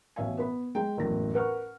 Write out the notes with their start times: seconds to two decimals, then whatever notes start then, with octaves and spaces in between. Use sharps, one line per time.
0.16 A1 B2 C#5 E5 F5 G#5
0.37 B3 B4 B5
0.75 G#3 G5
0.98 F#1 E2 A2 A#6
1.34 A#4 B4 F#5 C#6 F6